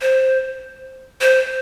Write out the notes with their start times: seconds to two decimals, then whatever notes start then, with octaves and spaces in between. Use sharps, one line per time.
0.01 C5
1.21 C5